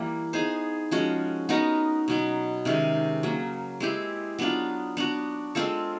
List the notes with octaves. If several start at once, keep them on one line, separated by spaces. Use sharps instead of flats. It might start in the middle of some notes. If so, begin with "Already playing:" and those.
Already playing: E3 G3 A#3
B3 D#4 G#4 C5
F3 G#3 C#4 F#4
B3 D#4 F#4 A#4
B2 F#3 B3
C3 D#3 G#3 C#4
C#3 F#3 A#3
G#3 C4 E4 G4
F#3 B3 D4 F4
B3 D4 F#4
G#3 C4 F4 A4